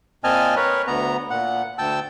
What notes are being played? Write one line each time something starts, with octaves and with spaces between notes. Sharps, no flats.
A#2 C4 D#5 G#5 A5 F6
A#4 B4 C#5
D2 B3 A#5
A#2 F#5
D2 G5 A5 E6